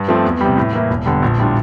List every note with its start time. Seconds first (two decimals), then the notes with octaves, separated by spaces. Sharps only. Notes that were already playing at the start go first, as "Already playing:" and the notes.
Already playing: G2
0.08 F3 A3 C4
0.25 E2
0.41 C3 G3
0.57 A2
0.73 E3 A#3 E4
0.90 E1
1.06 E2 D3 G3
1.22 A#1
1.38 A2 G3 D4 F4